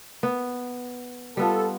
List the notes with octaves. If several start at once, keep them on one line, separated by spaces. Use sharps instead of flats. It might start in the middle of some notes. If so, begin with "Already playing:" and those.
B3
G3 B3 F4 A4